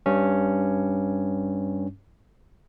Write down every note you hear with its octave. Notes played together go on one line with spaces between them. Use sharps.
G2 C#4